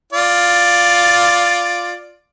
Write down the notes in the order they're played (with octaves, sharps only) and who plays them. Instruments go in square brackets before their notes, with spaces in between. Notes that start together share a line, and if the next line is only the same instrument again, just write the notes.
[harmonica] F4 D5